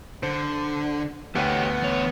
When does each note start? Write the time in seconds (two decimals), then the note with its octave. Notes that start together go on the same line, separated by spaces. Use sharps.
0.23 D3 C5
1.35 D2 B3 G4 C#5 F#5 G5
1.82 E2 C#5